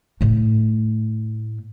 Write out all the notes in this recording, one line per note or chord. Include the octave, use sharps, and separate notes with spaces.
A2 A3